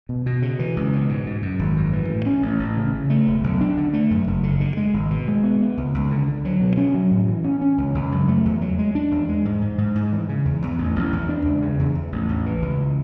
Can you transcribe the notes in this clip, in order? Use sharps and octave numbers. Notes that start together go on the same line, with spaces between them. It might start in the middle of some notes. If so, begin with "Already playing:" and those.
B2
B2
C#3
E3
C#2
B2
G#2
G#2
F#2
G#1
F#2
E3
A2
C#4
A1
A1
C#3
C#3
A3
E1
B1
D4
D3
A3
F#2
F#1
D3
D3
G#3
G#1
B2
G#3
B3
B3
C#2
C#2
D3
D3
F#3
B2
C#4
F#3
A2
E3
C#4
C#4
C#2
C#2
F#2
A3
E2
F#3
G#3
D4
E2
G#3
G#2
G#2
G#2
G#2
E3
C#3
E2
E2
A1
A1
E2
D4
C#2
C#3
E2
E2
A1
A1
E3
C#2